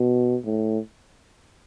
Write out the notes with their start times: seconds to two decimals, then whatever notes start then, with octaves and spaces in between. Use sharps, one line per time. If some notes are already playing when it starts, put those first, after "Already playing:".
Already playing: B2
0.45 A2